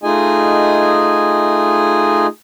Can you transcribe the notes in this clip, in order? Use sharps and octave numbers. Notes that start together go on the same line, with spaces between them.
A3 D#4 F4 G#4 D#5 G#5